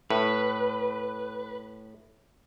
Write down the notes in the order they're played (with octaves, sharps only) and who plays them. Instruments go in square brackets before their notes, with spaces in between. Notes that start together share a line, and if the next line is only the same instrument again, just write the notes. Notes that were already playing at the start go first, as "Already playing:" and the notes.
[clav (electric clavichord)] A2 [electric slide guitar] B4